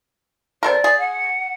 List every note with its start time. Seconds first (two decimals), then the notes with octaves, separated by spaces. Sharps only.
0.63 C3 A4 A#4 D5
0.84 G#4
0.98 F#5